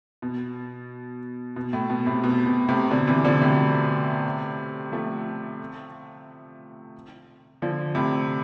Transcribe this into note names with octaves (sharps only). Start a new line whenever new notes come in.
B2
B2
A2
B2
A2 C3
B2
B2
A2 C3
B2 D3
C3 E3
D3 F3
A2 C3
F3 A3
D3 F3
A2 C3